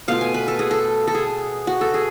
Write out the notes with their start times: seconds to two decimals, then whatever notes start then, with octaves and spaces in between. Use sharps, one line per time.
0.08 B2 A3 F4 F5
0.21 G#5
0.34 B4
0.48 A4
0.59 G#4
0.71 A4
1.08 A4
1.14 G#4
1.67 F#4
1.81 A4
1.94 G#4